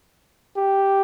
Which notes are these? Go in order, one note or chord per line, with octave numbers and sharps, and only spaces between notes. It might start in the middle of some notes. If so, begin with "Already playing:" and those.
G4